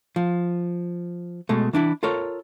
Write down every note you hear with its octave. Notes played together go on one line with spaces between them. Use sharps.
F3
B2 G#3 A3
E3 D4 E4
F4 A4 A#4 C#5